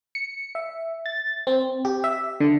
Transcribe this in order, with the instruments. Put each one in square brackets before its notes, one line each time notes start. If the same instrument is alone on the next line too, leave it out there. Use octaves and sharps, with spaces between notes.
[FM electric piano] C#7
E5
A6
C4
G4
E5
D3